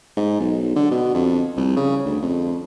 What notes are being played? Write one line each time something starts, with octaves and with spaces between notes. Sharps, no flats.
G#2
B1
D3
B2
F2
C2
C#3
D2
F2